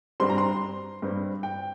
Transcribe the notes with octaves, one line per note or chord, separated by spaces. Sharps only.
G2 G3 C4 C6
A#5
C6
G2 G3 C4
G5